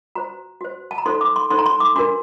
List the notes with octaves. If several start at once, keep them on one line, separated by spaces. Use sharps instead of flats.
F#4 C5 A#5
F#4 C5
A5
A#5
D#4 A4 C5 C6
D6
C6
D#4 A4 C5 C6
A#5
C6
D6
D4 F#4 A#4 C6